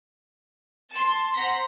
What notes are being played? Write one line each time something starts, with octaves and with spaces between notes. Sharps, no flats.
A5 C6
C5 F#5 A#5 C6 A#6 B6